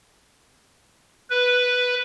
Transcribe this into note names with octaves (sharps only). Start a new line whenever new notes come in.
B4